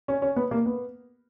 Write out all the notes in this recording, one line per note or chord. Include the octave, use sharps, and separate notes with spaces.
C#4
C#4
B3
A#3
B3